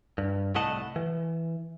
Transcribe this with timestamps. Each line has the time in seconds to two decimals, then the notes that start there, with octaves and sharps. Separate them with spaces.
0.18 G2
0.55 C2 A2 A3 D#5 F#5 A5
0.96 E3